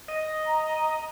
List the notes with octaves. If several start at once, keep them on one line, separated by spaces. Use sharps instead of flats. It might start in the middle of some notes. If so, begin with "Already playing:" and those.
D#5
A#5